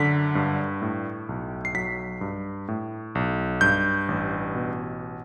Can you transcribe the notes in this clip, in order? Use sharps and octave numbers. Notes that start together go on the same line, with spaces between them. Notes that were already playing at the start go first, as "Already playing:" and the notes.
Already playing: F#2 D3 B6
G2
A2
B1
C7
F#3 B6
G2
A2
B1
G2 G6
A1
B2